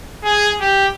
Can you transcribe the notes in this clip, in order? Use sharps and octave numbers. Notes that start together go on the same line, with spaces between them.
G#4
G4